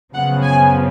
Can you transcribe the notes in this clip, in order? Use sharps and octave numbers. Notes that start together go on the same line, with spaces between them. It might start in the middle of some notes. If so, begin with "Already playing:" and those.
F#2 C#3 F3 B3 F#5
G#5